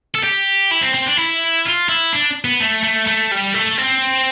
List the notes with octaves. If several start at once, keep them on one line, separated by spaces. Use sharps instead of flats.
A4
G4
E4
C4
C4
D4
E4
F4
E4
D4
B3
A3
A3
A3
G3
A3
C4